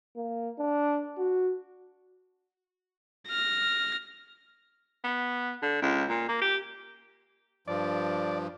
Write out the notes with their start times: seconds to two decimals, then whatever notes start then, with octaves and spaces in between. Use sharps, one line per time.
0.16 A#3
0.59 D4
1.18 F#4
3.28 F6 A#6
5.04 B3
5.62 D3
5.82 C#2
6.09 A#2
6.29 A#3
6.41 G4
7.68 G2 F3 D5